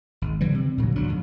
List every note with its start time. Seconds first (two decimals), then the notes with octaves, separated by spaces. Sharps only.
0.22 G#1
0.41 D3 E3 F3 G3
0.54 C3
0.78 A#2 D3 F3 F#3
0.95 A#1 F#3 D4
1.08 F2 G#2